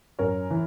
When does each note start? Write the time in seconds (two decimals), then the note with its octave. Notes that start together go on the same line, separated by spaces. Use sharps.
0.19 F#2 A#4 C#5
0.50 E3